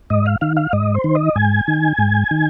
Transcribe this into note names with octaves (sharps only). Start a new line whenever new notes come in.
G#2 D#5
F5
D#3 F5
F5
G#2 D#5
C5
D#3
D#5
G#2 G#5
D#3
G#2
D#3